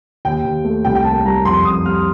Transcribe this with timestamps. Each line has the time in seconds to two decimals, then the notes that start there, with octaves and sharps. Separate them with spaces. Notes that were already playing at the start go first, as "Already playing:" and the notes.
0.25 D#2 G5
0.45 D#2
0.64 A3
0.85 C2 G5
0.95 G5
1.04 A#3 A5
1.25 G3 A#5
1.45 F2 C6
1.65 F2 D#6
1.85 G3 F6